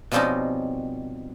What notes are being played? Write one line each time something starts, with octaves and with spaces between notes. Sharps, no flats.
B2 F3 G3 C4 C#4 D#4